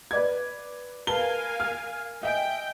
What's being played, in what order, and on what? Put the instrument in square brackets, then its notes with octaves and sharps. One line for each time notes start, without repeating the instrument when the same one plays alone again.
[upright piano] B4 D5 G#6
[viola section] A#4 F5 G#5 [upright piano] B4 A5 G7
[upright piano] F6
[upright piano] D#5 E5 G#5 [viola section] G5